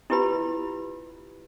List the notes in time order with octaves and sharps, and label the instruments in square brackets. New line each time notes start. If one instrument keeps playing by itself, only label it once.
[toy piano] E4 F4 G4 B4 B5